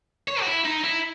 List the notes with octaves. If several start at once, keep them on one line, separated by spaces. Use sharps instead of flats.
C#5
F#4
E4
D#4
E4